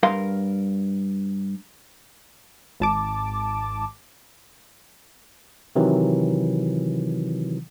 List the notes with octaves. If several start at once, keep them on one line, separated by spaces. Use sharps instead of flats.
G2 A#4 F5 C6
G#1 A5 D6
C3 D#3 E3 F#3